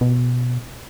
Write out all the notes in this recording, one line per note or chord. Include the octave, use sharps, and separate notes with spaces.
B2